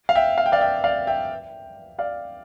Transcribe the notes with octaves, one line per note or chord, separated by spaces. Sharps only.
F5
E5 G5
F5
G5
D5 F5
E5 G5
D5 F5
E5 G5
D5 F5